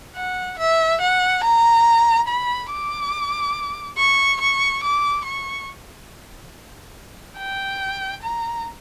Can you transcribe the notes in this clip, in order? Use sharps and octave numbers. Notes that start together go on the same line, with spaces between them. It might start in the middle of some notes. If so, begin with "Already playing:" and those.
F#5
E5
F#5
A#5
B5
D6
C#6
C#6
D6
C#6
G5
A#5